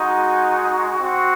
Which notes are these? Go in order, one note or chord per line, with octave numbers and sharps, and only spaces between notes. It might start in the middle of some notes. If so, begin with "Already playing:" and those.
Already playing: G#3 D#4 F#4
C4 F#4